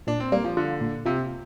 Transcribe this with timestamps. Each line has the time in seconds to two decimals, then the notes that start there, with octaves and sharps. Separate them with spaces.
0.07 A#2 D4
0.20 C4
0.32 G3 A#3
0.44 F3
0.57 D3 F4
0.81 A#2
1.06 C3 F4